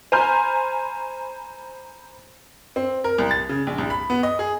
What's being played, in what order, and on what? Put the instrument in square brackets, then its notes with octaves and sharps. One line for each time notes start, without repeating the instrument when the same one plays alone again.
[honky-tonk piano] C5 G#5 A#5 B5 F6 G6
[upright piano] C4
A#4
C2
A6
C#3
A#1
C2
B5
B3
D#5
G#4